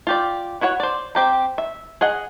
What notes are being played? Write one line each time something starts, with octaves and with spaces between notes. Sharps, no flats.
F4 G4 D5
E4 F#4 C#5 F#5
C5 D5
C4 G4 A#5
E5
G#4 D#5 F#5